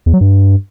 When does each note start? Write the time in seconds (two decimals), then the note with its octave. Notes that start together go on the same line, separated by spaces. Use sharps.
0.06 E2
0.14 F#3
0.21 G2